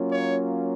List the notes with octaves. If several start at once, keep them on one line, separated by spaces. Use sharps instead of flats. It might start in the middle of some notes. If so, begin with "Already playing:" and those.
Already playing: F#3 A#3 C#4 F4
C#5